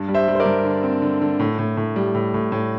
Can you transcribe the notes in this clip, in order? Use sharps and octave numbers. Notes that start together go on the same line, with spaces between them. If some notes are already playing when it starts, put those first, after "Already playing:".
Already playing: G2
G3
C5 E5
G3
C5
A#4 D5
G2
D3
C4
D3
D3
A2
A2
A2
G3
A2
A2
A2